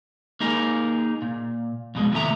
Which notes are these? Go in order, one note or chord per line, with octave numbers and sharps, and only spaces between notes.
A#3 D#4 G#4 A#4
A#2
F2 B2 G#3
D#2 A2 C3 A3 E5 A#5